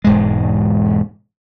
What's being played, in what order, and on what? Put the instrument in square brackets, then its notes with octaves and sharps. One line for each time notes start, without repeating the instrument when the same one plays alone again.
[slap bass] E1 G#2 G#3